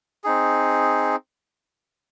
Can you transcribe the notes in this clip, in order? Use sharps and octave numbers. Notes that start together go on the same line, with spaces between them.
C4 D#4 G#4